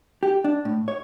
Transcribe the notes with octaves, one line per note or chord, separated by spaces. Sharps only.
G4
D4
A2
C#5